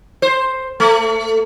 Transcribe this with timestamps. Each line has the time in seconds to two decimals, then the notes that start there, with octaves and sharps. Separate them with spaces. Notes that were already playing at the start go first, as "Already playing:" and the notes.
0.22 C5
0.80 A3